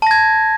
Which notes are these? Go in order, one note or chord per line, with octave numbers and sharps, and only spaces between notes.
A5 G#6 A#6